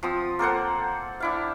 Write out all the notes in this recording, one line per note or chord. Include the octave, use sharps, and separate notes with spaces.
F3 C4 D#6
A#3 A4 C5 F#5
D4 E4 F5